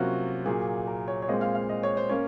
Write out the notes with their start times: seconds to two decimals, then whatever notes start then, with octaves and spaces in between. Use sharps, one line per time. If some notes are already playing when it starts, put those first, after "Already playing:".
Already playing: C3 F#3 A#3 C#4 F4 F#4
0.46 A#2 F#3 A#3 G#4
0.87 A#4
1.08 C#5
1.22 C#5
1.28 A#2 G#3 C4 D#5
1.41 F5
1.55 F5
1.69 D#5
1.83 C#5
1.97 C5
2.09 A#3 C#4 C#5